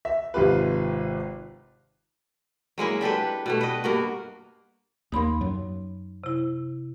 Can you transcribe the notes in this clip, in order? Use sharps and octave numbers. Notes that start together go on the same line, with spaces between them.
E5
G#1 C3 F4 G4 B4
F#3 G#3 A#3 E4
D4 G4 A4 B4
B2 G3 A3
B4 D#5
G2 A#3 F#4
D#2 G3 A#3 D#4 B5 C6
F#2 F#3
C3 E4